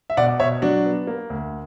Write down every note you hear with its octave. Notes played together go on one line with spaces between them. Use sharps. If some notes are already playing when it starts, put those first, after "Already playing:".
E5
B2 D5 F#5
B2 C#5 E5
F#3 D4 F#4
B3
A#3
D2